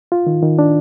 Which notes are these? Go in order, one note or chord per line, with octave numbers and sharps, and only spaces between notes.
F4
D#3
D#3
D4